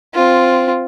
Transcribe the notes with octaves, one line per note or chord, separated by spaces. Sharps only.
C4 F4